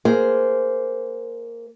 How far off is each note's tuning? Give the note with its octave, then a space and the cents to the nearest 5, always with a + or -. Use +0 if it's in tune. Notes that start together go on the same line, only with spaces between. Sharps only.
A#3 -5 G#4 +0 C5 -10